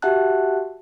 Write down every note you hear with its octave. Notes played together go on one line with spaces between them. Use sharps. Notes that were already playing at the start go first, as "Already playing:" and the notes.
F#4 G4 E5 F#5 A5 F#6